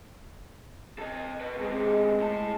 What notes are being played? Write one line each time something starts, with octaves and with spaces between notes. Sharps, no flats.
A4 D#5
B4 D#5
B2 G#3 C4
A2 A5